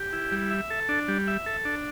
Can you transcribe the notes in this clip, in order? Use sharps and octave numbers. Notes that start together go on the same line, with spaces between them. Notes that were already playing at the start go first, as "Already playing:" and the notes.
Already playing: G4
E4
G3
E5
A4
D4
G3
E5
A4
D4